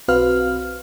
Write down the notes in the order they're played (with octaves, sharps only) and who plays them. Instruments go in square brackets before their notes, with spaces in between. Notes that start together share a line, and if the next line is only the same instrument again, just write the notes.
[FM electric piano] B1 C4 F#4 B4 F5 F6